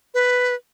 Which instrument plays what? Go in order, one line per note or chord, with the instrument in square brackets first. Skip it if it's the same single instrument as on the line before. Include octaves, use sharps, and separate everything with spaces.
[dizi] B4